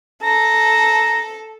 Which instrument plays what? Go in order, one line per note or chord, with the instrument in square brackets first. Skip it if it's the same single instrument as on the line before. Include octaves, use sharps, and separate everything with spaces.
[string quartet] A4 [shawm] A#5